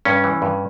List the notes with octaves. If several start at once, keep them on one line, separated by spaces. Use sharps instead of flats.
G2 C#4
E3
G2